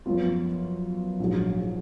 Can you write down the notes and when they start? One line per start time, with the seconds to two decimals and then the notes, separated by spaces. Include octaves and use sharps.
0.06 F#2 F3 B3 F4
1.20 A#1 G#2 F#3